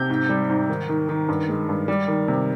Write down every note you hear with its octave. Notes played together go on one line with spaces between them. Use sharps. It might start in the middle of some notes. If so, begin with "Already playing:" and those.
Already playing: C3 G6
G#2
G3
G#2
D#3
D#3
D#3
G2
G#3
G2
G3
D#3
C3